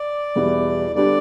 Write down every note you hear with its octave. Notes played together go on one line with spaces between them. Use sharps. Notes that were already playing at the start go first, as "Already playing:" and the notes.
Already playing: D5
E2 B2 G3 B3 E4
D3 G3 B3 D4 G4 D5